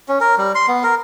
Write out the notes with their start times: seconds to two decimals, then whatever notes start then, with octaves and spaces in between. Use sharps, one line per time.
0.08 C#4
0.21 A#4
0.38 G3
0.55 C6
0.68 B3
0.84 A#4